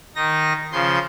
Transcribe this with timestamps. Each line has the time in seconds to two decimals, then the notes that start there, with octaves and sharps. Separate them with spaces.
0.15 D#3 D#4 A#6
0.72 C#3 F3 C6 G6